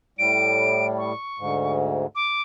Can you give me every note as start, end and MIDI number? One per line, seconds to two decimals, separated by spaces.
0.19 1.13 45
0.19 1.13 55
0.19 0.86 98
0.98 1.78 85
1.38 2.06 38
1.38 2.06 44
2.15 2.42 86